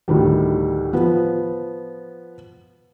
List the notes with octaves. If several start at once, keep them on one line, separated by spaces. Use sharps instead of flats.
D2 A2 D#3 G3
F3 B3